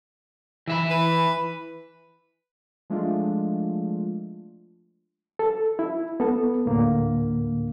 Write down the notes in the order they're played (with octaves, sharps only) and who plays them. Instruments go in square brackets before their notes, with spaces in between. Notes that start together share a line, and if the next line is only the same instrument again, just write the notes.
[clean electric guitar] E3 E5 B5
[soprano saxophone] B4
[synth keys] F3 G#3 A3 D4 F4
[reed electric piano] A4
E4
B3 A4
D2 A2 D3 A#3